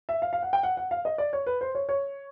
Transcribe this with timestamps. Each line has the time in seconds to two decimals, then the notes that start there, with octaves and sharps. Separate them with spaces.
0.09 E5
0.22 F5
0.33 F5
0.43 F#5
0.53 G5
0.63 F#5
0.77 F#5
0.91 F5
1.05 D#5
1.18 D5
1.33 C#5
1.47 B4
1.61 C5
1.75 C#5
1.89 C#5